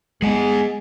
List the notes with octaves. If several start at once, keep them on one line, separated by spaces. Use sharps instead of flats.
G3 G#3 B3 G#4 F#5 G#5